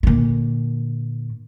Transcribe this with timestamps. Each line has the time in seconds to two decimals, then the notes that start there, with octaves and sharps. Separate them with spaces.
0.03 A#2 D3